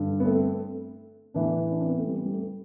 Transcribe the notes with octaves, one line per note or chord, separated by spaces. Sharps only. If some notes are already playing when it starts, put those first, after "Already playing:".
Already playing: G2 D3
B3
A3 C4
A2 E3 B3 D4
D4
C4
B3
A3 C4
G3 B3
G3
A3